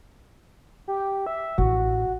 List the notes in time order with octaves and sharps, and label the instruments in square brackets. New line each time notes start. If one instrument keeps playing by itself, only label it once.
[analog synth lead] G4
E5
[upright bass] A1 [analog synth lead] F#4